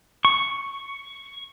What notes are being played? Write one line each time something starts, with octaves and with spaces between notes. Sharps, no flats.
C#6